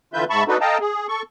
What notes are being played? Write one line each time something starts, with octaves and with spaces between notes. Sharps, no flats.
D3 E3 F4 B4 E5 G6
G#2 E5 A5 B5 C#6
B3 D4 D#4 F#4 A4 B4
A4 D#5 F5 G5 A5 A#5
G#4
A4 C#6